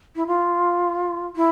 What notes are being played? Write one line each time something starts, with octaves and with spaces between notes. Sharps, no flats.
E4
F4
E4